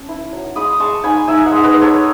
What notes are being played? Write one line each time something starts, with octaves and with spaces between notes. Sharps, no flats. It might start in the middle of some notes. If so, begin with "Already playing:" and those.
Already playing: C#4 A5
E4
F#3
G#3 B5 D#6
G#3 A5 C#6
D#4 G#5 B5
D#4 E5 G#5
D#5 F#5
G#3
B4 D#5
G#3
A4 C#5